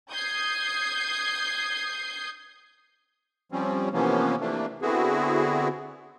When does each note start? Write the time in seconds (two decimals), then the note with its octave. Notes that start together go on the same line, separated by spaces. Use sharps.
0.11 D#6 G6 G#6 C7
3.52 F3 G3 C4 C#4
3.93 C3 E3 F3 A#3 B3 C#4
4.40 C3 E3 A3 A#3 D4
4.82 D3 B3 C4 E4 F#4 G#4